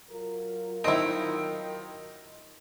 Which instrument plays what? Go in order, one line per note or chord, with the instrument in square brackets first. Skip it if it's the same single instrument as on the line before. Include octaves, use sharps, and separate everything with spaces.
[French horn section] F#3 F4 A#4
[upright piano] D#3 C6 D7 [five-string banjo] C4 E4 [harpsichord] D#4